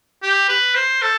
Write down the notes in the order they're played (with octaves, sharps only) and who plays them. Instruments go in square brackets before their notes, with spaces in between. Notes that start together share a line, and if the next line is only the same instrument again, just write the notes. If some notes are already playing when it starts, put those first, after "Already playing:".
[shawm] G4
B4
C5
A4